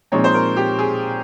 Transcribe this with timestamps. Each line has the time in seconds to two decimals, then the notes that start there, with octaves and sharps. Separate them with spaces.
0.12 A#2 F3 G#3 C4 D#4 C#5
0.24 C5
0.34 A#4
0.56 G4
0.79 G#4